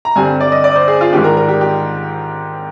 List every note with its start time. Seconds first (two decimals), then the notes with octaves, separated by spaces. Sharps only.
0.05 A#5
0.16 G2 D3 G3 C4 G#5
0.40 D5
0.52 D#5
0.64 D5
0.76 C5
0.88 G#4
1.01 F4
1.13 G#2 D#3 G3 D4 G4
1.24 A#4
1.37 A#4
1.48 G4
1.61 G4